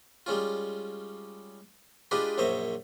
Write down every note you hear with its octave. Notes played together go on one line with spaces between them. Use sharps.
G3 G#3 C#4 F4
G#3 D4 F4 G4 B4 D#5
A#1 F#2 C5 C#5 D#5 E5